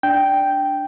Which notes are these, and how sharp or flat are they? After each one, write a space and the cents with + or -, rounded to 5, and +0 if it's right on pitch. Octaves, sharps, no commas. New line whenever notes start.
D4 +0 G5 +0